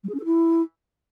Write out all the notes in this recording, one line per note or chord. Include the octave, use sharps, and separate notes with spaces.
G3
G#4
C#4
A4
E4